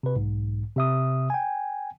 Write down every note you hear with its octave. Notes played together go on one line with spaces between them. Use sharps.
C3 B4
B1 G#2
C3 E5 D#6
G5 G#5